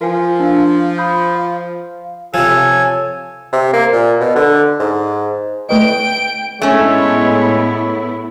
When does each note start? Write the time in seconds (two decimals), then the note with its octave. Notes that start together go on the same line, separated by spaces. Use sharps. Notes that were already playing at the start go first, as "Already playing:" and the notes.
0.01 F3 A#4 G#5
0.40 D4 F5
0.98 B5 D#6 G6
1.35 F5
2.34 C3 F3 A4 C#5 G#5
3.52 C3
3.73 A#3
3.92 A#2
4.20 B2
4.36 D3
4.79 G#2
5.69 A3 B4 D#5 G5 D7
6.62 A2 G#3 A3 B3 C#4 E4 C#5